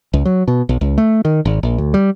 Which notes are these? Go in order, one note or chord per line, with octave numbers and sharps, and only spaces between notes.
C#2
F#3
B2
B1
C#2
A3
D#3
G#1
A#1
D2
G3